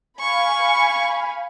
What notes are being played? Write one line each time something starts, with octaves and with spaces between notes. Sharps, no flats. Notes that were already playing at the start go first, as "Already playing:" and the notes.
F5 G#5 B5 C#6